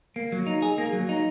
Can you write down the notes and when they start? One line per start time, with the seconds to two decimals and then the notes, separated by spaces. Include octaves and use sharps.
0.16 A#3
0.32 F#3
0.47 D#4
0.62 G#4
0.78 A#3
0.93 F#3
1.09 D#4